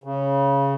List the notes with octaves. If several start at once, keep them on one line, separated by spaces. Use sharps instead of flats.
C#3